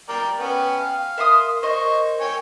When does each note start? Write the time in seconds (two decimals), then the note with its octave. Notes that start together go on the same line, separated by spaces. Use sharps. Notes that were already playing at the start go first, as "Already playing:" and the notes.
0.09 A#4 D5 G5
0.40 B3 C#4 G5
0.80 F5
1.18 A#4 E5 C6 D#6
1.63 C5 D#5 C#6
2.20 C#5 G5 G#5